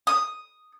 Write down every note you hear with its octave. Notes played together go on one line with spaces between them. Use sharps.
D#6